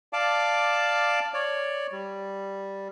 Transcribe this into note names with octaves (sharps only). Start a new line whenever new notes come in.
D5 F5 A5 D6
C#5 D5
G3